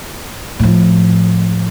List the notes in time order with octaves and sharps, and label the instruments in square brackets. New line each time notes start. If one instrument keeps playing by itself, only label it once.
[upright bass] A2 F3